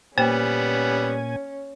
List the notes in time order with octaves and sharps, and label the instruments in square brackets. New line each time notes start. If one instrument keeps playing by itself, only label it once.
[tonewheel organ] A#2 G#5 [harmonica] G3 B3 [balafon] A#3 C5 G5 [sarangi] C#4